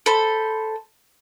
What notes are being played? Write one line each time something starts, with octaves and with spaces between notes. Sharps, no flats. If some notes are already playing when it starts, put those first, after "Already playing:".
A4 C5 B5